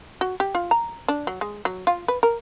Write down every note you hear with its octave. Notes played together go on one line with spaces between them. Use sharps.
F#4
G4
F4
A#5
D4
F#3
G#3
F#3
F4
B4
A#4